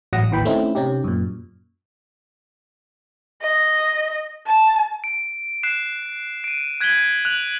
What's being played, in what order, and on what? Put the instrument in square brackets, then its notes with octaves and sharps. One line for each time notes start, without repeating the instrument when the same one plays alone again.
[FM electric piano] A1 F#3 F#5 D#6 A#6
A1 D#2 E3 G5 B5
A3 C4 C#4 D#4 E4
C3 C#4 D#4 G4
F#2 A#2
[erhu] D#5
A5
[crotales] D7
F#6 C7 E7
D7 D#7
F#6 G#6 B6 D#7 F#7 G7
F#6 F7 F#7